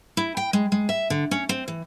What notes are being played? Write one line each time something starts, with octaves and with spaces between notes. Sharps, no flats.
E4
G5
G#3
G#3
E5
D3
C#4
C4
E3